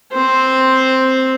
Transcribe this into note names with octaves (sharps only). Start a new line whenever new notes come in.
C4 C5